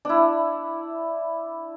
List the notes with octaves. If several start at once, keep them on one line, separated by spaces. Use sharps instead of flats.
D4 E4